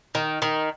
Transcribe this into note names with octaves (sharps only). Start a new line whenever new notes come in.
D#3
D#3